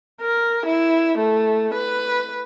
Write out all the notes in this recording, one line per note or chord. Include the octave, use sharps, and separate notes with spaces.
A#4
E4
A3
B4